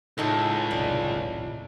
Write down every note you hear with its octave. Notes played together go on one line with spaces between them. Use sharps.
C#2 A2 D#4 A4
D#1 B1 C3 D5